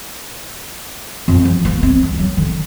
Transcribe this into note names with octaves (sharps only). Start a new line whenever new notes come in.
F2
F3
A#3
C4
D2
F#3
D3